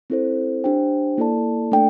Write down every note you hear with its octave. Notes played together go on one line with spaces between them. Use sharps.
C4 E4 A4 C5
D4 G4 C5 G5
A#3 E4 A4 D5 A5
A3 D4 A4 D5 G5